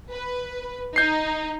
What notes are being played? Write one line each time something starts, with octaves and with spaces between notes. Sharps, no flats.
B4
D#4 G6 C7